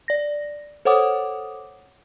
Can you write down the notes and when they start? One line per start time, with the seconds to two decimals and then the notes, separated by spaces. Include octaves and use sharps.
0.08 D5 A#6
0.85 A4 C5 C#5 F#5 D6 D#6